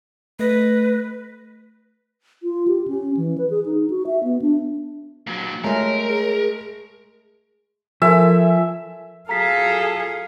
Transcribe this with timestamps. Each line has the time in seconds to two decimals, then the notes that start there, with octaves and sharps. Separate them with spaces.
0.39 A3 B4 D#5 A#6
2.43 F4
2.68 G4
2.88 C#4
3.17 E3
3.38 B4
3.50 G#4
3.66 D#4
3.90 F#4
4.07 E5
4.24 B3
4.42 D4
5.27 A#2 F#3
5.64 G#3 A3 A#4 C#5
6.09 G#4
8.02 F3 A4 A#4 E5 G#5
9.29 F#3 F4 G#4 A4 F5 A#5 B6